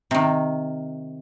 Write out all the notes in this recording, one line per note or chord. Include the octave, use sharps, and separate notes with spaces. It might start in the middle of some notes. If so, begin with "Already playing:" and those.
C3 D#3